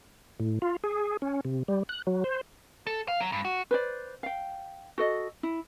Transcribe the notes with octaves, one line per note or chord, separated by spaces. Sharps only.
A2
F4
G#4
C#4
C3
G3
F#6
F#3
C5
A4
F5
F#3
G2
F#4
B4 C5 D5
F5 G5
F#4 A4 D#5
E4